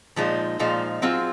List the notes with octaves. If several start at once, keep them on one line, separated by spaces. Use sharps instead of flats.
A#2 F3 G#3 D#4
A#2 F3 G#3 D#4
F#3 C4 F4 G#4